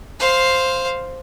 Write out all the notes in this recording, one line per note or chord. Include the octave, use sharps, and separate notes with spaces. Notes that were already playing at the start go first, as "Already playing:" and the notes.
C5 F5